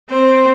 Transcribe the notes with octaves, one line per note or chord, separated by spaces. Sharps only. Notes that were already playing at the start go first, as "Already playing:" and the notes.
C4 C5